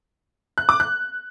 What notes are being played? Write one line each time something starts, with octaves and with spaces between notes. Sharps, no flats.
F#6
D6
F#6